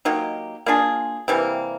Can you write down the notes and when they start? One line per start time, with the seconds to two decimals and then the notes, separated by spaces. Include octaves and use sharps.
0.05 F#3 A#3 D#4 G4
0.66 A#3 D4 F4 G#4
1.28 C3 E3 G3 A#3